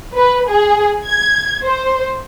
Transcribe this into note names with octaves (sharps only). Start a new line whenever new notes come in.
B4
G#4
G#6
C5